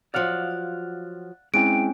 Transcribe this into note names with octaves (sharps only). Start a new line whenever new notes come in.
F3 F#3 D5 F5 F#5
G#3 C4 C#4 E4 G5 D7